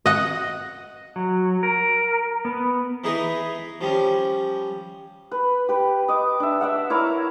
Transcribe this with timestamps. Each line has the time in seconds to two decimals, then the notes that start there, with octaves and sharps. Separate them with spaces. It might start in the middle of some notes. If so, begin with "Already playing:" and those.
0.06 D#5 F#5
1.16 F#3
1.63 A#4
2.45 B3
3.04 E3 D#4 G#4 B4 D#5
3.81 F3 G3 C#4
5.31 B4
5.69 G4 B4
6.08 D#5 D6
6.40 D4 E5
6.61 D5 E5 F#5
6.90 E4 A#4 C#5 D6